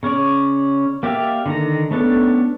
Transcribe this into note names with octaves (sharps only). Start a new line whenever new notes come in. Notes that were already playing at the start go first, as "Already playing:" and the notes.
C#3 C#4 C#5 D5
A#3 G4 D5 E5 F5
D3 D#3 A#5
A3 B3 C#4 D4 A4